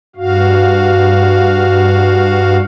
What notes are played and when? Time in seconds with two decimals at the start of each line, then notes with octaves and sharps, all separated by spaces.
0.16 G2 F#4 F5